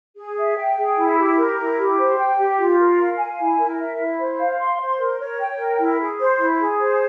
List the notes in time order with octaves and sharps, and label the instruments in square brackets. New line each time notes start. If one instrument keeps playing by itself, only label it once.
[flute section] G#4
E5
G5
G#4
E4
G4
A#4
E4
G4
C5
G5
G4
F4
A#4
F5
G#5
E4
A#4
E5
E4
C5
F5
C6
C5
A#4
C#5
G5
A#4
E4
G#4
C5
E4
G#4
C5